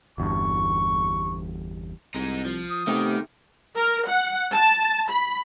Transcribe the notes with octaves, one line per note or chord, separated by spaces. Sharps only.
G1 E2 G2 C#6
C2 G#3 D#4
F3
D#6
C3 D#3 A3 B3 G4
A#4
F#5
A5
B5